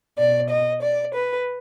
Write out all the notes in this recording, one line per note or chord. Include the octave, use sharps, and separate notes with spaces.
B2 D5
D#5
D5
B4